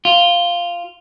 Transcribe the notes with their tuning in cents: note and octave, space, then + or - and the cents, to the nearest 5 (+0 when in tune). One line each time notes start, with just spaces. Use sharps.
F4 -5